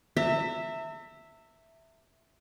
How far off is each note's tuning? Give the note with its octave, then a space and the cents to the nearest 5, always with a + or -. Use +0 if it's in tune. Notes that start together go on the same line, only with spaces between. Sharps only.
E5 +0 A#5 -45